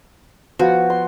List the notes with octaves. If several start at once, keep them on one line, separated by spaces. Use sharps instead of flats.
F3 B3 F#4
C6